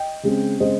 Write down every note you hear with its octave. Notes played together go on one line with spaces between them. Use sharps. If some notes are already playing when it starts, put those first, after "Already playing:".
Already playing: D#5 G5
C#3 G#3 C4
C#3 G#3 C4 C5 D#5